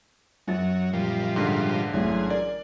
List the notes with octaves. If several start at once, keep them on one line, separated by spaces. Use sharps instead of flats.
F#2 F#3 A6
A#2 F3 G3
G#2 D3
A1 F#3 G#4
A#4 D5